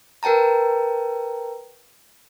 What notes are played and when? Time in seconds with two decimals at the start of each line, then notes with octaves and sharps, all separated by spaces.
0.23 A#4 B4 G5 A5 A#5